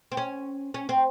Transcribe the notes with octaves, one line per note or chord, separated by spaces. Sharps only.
C4
C#4
C#4
C4